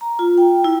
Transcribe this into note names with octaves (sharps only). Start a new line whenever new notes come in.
A#5
F4
G5
E4